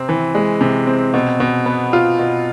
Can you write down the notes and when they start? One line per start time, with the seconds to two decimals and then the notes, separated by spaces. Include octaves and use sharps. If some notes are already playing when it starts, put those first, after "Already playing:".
Already playing: C3 C4
0.09 E3
0.35 G#3
0.61 C3
0.87 C4
1.14 B2
1.40 B2
1.66 B3
1.93 F4
2.19 B2